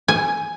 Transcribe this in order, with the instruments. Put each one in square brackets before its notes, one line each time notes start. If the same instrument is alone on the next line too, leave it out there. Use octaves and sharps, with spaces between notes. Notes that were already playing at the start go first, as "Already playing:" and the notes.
[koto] G#5